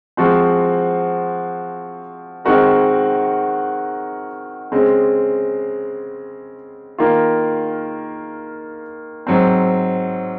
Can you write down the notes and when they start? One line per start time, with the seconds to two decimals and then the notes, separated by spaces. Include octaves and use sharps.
0.17 F3 G#3 C4 F#4
2.45 D#3 G#3 C4 F#4 A#4
4.72 C#3 G#3 C4
6.98 D#3 A#3 F4
9.27 G#2 F#3 C4